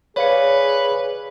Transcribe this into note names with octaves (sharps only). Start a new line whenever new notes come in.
G#4 B4 C#5 D5 F5 C#7